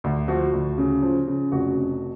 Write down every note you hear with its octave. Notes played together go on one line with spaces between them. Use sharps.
D2
F3 F#4
D2
C#3
F3
C#3
F1 F#4
F2